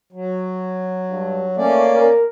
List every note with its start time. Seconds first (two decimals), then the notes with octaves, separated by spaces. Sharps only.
0.12 F#3
1.10 G2
1.57 A3 A#3 C#4 D5
1.94 A#4